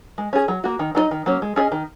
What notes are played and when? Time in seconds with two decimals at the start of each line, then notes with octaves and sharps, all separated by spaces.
0.18 G#3
0.33 C#4 G#4
0.48 F#3
0.64 A#3 F#4
0.79 D#3
0.95 F#3 D#4 A#4 D#5
1.11 D#3
1.26 F#3 A#3 C#4
1.42 G#3
1.56 C#4 G#4 D#5
1.72 D#3